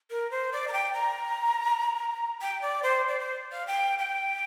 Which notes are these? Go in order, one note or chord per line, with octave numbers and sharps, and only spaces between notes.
A#4
C5
D5
A#5
G5
A#5
G5
D5
C5
D5
C5
F5
G5
G5